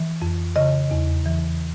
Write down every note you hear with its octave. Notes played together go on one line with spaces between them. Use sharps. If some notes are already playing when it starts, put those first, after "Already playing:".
Already playing: E3
F2
C#3 D#5
E2
E3